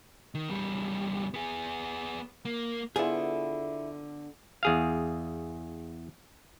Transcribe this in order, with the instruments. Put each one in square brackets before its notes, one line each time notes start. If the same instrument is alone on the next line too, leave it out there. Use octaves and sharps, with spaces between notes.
[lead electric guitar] D#3
E2 G3
B3 G#4
A#3
[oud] D3 B3 F4 [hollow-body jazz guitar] E4 G#4
[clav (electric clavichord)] E2 G#4 F5